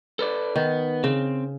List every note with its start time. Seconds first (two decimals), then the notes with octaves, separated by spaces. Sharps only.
0.19 A4 B4 D5
0.56 D#3 B3
1.04 C#3 C4